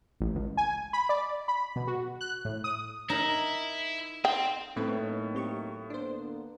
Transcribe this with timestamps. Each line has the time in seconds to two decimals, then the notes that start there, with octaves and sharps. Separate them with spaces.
0.20 A1
0.35 C#2
0.57 G#5
0.93 B5
1.09 D5
1.48 B5
1.76 B2
1.87 F#4
2.21 F#6
2.45 A2
2.64 D#6
3.10 D#4 E4 A#4
4.25 C4 G5
4.76 A2 F#3 A3 A#3 C4 C#4 D#4 B4
5.35 C4 G4 C#6
5.90 D3 A#3 B3 D4 C5